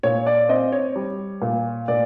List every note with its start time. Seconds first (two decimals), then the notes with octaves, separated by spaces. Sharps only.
0.03 A#2 C#5
0.27 D5
0.49 C4 D#5
0.72 C#5
0.96 G3
1.42 A#2
1.88 A#2 D5